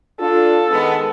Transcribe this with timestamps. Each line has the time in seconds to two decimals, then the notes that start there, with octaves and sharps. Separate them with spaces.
0.20 D4 F4 A4
0.71 D#3 G#3 B3